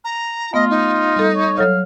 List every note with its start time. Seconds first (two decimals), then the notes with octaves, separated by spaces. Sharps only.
0.04 A#5
0.54 A3 B3 F4 D#5
0.70 D#4
1.16 G3 A4
1.35 C#5
1.58 F#3 A4 C#5 F5